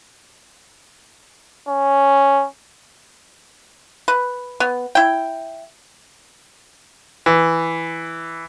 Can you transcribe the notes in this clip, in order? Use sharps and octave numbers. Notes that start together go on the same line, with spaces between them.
C#4
B4
B3
E4 G5
E3